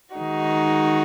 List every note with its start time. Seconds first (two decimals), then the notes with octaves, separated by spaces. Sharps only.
0.14 D#3 G#3 D#4 F#4